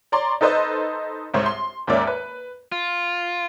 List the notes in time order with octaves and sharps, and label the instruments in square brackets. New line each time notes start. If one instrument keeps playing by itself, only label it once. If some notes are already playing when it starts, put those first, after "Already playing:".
[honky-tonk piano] C#5 D5 A#5 C6
D#4 A4 B4 C5 D#5
C2 G#2 C5 C#5
C6
D#2 G#2 A#3 C#4 D5 E5
B4
[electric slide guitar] F4